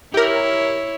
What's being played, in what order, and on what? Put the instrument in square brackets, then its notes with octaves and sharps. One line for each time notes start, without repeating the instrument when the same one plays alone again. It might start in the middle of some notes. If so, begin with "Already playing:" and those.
[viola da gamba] E4 C#5 [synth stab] G4 A#4